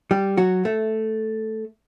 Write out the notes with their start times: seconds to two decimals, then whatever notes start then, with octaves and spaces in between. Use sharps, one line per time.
0.11 G3 G4
0.37 F#3 F#4
0.65 A3